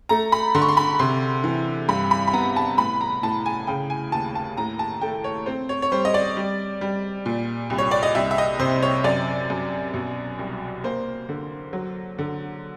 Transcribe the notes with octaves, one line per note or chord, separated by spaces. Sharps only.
A3 A#5
B5
D3 C6
C#6
C6
B5
C3 C6
E3
G2 B5
B5
B5
B3 A#5
A5
A2 B5
A#5
A2 A5
G#5
C#3 G5
G#5
D#2 A5
A5
A2 A#5
A5
A3 G5
C#5
C4 C5
C#5
C#5
G3 C5
D#5
D5
G3
G3
A#2
C2
C#5
D5
D#5
C2 E5
E5
D#5
C3 C5
C#5
F#2 D5
F#2
B2
C2
A#3 C5
D3
F#3
D3